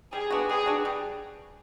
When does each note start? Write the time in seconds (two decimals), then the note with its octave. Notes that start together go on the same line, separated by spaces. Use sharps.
0.13 G3 G#4
0.30 B3 D4 F#4
0.49 G3 G#4
0.66 B3 D4 F#4
0.85 G3